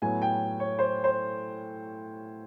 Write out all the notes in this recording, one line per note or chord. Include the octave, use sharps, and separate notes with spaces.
A2 F#3 B3 G#5
G5
C#5
C5
C5